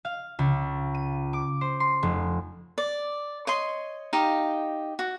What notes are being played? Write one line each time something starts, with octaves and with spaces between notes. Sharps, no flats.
F5
C#2
D#7
D6
C5
C6
F1
D5
C#5 D#5 C6
D#4 G4 F5
F#4